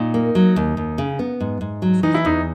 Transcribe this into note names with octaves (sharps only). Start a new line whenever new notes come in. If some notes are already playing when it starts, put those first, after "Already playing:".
Already playing: A#2 D#4
A#3
F#3
D#2
D#2
C#3
B3
G#2
G#2
F#3
E3 D#4
E4
E2 D#4